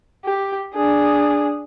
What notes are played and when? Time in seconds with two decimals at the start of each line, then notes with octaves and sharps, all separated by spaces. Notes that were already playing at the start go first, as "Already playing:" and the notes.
0.25 G4
0.74 D4 G#4